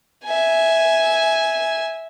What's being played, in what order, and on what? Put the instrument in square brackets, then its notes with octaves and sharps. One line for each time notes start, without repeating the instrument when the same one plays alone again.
[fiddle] E5 G#5